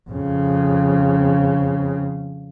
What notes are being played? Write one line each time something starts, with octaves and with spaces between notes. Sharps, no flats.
F2 C#3